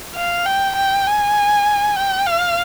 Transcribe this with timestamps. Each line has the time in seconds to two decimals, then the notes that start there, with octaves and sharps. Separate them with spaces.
0.15 F5
0.45 G5
0.76 G5
1.06 G#5
1.96 G5
2.26 F5